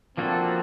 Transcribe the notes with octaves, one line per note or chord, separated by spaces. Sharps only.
F3 A#3 C4 D4 F#4 A4